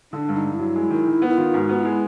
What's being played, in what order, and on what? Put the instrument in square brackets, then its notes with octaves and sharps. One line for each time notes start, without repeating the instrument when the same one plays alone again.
[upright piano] D3 [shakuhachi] D4
[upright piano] G2 [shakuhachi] D#4
[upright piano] G2
[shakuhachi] E4
[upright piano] F#3
G#3
D#3
D#3
B3
[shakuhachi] E4
[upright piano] D#3 [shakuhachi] F4
[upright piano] G#2 [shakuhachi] F#4
[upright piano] B3
[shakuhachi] F4
[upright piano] G#3 [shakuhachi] E4